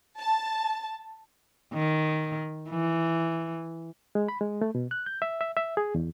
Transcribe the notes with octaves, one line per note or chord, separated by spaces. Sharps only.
A5
D#3
E3
G#3
B5
G#3
A3
B2
F#6
G6
E5
E5
E5
G#4
E2